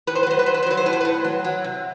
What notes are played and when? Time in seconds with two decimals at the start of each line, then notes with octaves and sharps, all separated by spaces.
0.07 A2 B4
0.15 C5
0.23 B4
0.27 F#3 C5
0.39 B4
0.46 F#3 C5
0.54 B4
0.62 C5
0.66 F#3 B4
0.77 C5
0.86 A2 B4
0.93 C5
1.01 A2 B4
1.24 F#3
1.44 F#3
1.64 C3